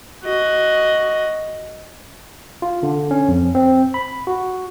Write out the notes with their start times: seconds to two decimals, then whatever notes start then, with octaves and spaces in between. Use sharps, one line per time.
0.24 F#4 D#5
2.62 F4
2.83 D3
3.11 C#4
3.28 F2
3.55 C4
3.94 B5
4.27 F#4